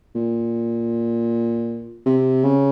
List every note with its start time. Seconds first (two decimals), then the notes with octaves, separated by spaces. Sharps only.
0.15 A#2
2.06 C3
2.43 C#3